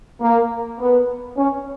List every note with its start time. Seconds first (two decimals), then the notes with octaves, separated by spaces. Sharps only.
0.21 A#3
0.79 B3
1.37 C#4